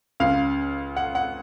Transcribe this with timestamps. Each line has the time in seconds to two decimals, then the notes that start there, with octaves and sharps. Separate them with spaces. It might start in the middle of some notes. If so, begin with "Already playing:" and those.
0.20 C#2 C#3 F5
0.97 F#5
1.15 F#5